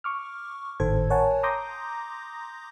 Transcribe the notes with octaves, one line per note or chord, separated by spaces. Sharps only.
C#6 D6 F6
G#1 A2 D#3 A4 C5 G#6
A#4 C#5 F#5 G#5 A5
A#5 C6 D6 D#6 G6 A#6